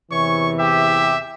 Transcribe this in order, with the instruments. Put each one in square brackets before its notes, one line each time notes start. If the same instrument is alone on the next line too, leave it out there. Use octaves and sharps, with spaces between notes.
[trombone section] E2 C3 E3 [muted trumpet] C#5 [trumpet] C#6
[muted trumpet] G4 [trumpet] E5